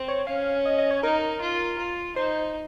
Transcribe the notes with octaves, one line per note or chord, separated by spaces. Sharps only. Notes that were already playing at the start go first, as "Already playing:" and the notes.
Already playing: C4
C#5
C#4 F5
D#5
D#5
C#5
D#4 A#4
F4
F4
D#4 C5